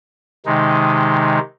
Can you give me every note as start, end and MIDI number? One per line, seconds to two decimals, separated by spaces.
0.46 1.39 48
0.46 1.39 51
0.46 1.39 56
0.46 1.39 63